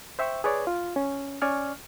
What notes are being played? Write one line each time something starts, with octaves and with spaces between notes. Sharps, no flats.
C5 E5 G5 C#6 E6
G#4 B4 C#5 D5
F4
C#4
C#4 D5 G#5 C#6 F6